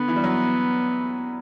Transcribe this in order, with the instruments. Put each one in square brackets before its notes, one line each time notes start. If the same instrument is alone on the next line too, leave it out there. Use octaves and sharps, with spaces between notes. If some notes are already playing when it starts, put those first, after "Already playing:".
Already playing: [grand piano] D3 [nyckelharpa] B3
[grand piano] E3
G3
F#3